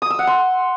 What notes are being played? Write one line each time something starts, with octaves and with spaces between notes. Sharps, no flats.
D#6
E6
F#5
C6